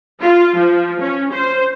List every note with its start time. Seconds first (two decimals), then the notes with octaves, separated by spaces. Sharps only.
0.21 F4
0.57 F3
1.01 C#4
1.33 C5